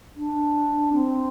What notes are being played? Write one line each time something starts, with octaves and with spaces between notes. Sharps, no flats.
D4
C4